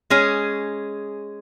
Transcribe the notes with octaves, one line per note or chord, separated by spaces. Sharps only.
G#3 C#4 G#4